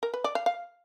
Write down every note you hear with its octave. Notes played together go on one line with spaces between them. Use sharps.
A#4
B4
D5
F5
F5